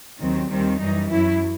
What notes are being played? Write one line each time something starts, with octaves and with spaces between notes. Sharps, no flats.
D#2 D#3 F#3 C4
D#2 D#3 G3 C4
F#2 E3 G3 D#4
F#2 F#3 E4